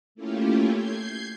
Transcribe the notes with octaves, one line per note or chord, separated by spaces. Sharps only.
A3 A#3 C#4 E4 F4 G4
G6 G#6 C7